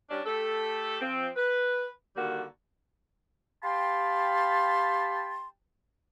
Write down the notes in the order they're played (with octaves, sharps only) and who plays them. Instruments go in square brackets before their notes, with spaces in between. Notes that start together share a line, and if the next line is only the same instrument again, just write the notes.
[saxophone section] G3 C#4 D4
A3 G4 A4
F3 C4
B4
D3 D#3 G3 A#3 F#4
[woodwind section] G4 F5 G5 A5 B5 C6